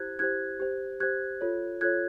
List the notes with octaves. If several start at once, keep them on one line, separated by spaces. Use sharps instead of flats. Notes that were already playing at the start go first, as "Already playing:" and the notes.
Already playing: E4 G4 C5 F#6 G#6
E4 G4 C5 F#6 G#6
G4 C5
G4 C5 F#6 G#6
F4 A4 C#5
F4 A4 C#5 F#6 G#6